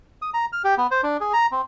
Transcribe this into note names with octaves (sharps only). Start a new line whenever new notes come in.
D#6
A#5
F6
G4
B3
C5
D4
G#4
A#5
C4